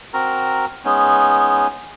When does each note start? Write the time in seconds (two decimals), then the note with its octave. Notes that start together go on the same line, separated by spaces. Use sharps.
0.14 C4 F#4 A#4 A#5
0.85 G#3 B3 C#4 D#4